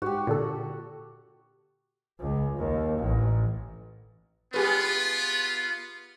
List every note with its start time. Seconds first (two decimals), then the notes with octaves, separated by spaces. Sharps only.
0.02 G#2 F#4 G4
0.27 A#2 D3 A4
2.20 C#2
2.57 D#2
2.99 A1
4.54 B3 F4 G4 G#4 B4